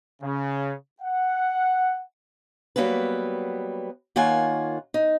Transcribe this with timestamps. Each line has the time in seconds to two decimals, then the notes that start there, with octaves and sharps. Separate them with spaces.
0.21 C#3
1.01 F#5
2.76 F#3 G3 A#3 B3 B4
4.16 D#3 A#3 F4 C#5 F#5 G#5
4.94 D#4